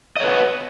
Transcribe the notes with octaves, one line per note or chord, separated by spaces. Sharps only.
B4 C#5 D#5 F#5